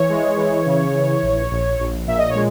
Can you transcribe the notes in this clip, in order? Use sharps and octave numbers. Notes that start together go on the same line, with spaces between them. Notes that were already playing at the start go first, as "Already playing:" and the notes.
Already playing: E3 C#5
G#3
E3
C#3
E3
A#1
A#1
A#1
A#2 E5
D#5
C#5
G#3